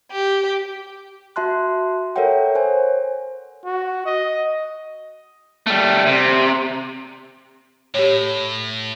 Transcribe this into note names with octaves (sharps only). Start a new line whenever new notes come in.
G4
F#4 E5 A5 C6 F#6
A4 A#4 C#5 E5 F#5 G5
C5 C#5 G#5
F#4
D#5
G3 A3
C3
A2 G4 C#5